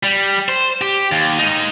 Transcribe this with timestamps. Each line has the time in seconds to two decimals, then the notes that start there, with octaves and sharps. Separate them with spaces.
0.03 G3
0.49 C5
0.81 G4
1.12 D#2
1.39 G#3 D#4